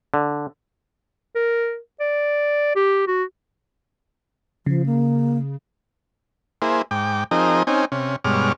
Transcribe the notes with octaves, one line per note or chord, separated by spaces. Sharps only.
D3
A#4
D5
G4
F#4
C#3 F3
A#3
A#3 E4 G#4 C5
G#2 G5 D6
F3 C4 D#4 G#4 A#4 D#5
C4 C#4 D#4 G#5
C3 C#4
G2 B2 G#3 C#5 D6 F6